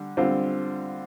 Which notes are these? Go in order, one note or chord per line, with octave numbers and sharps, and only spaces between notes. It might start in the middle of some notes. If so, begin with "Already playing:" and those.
Already playing: D3 G3
D3 G3 C4 F4